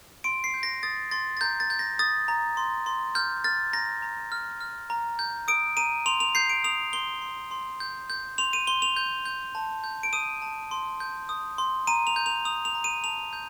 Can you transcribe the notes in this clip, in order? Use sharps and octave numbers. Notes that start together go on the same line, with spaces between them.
C6 D7
C7
G6
A#6
D#6 A6
C6 A6
A6
A#5 G6
A6
G6
A#6
D#6 A6
A#5
C6
C6
F6 G6
F6 A6
A#5 A#6
A#5
F6
F6
A#5
G6
D#6 D7
A#5 D#7
C6 F7
F7
G6 C7
D7
D#6 F7
C6 G7
C6
C6
G6
G6
C6 F7
D#7
C6 G7
F7
G6
G6
A5
G6
D7
D#6 D#7
A5
C6
G6
D#6
C6
A#5 D#7
F7
G6
F7
D#6 F7
F7
A#5
D#7
A5 F7
G6